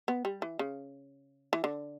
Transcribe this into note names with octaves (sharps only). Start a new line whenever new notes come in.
B3
G3
E3
C#3
E3
D3